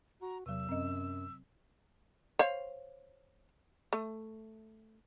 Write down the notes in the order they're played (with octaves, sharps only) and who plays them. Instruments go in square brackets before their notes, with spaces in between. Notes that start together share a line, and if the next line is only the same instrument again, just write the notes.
[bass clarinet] F#4 [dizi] A#5
[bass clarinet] E2 [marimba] C3 F#3 [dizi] E6
[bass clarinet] F#2 [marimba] C4 D#5
[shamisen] C5 C#5 F5
A3